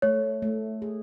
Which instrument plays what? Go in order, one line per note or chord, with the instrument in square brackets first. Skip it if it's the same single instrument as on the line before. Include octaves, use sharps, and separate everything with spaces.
[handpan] A3 [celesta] C#5
[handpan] A3
G#4